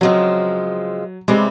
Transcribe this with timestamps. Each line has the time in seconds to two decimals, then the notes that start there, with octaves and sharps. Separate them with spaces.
0.01 C#3 F3 F#3 G#3 C4
1.28 C3 E3 G3 G#3 C4